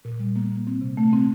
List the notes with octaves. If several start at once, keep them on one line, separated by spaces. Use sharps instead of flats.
A#2
G3
A#3
A#3
C4
C3
A3
C4